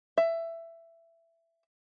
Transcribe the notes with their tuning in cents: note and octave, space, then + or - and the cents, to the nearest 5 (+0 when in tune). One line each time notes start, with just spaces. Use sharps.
E5 +15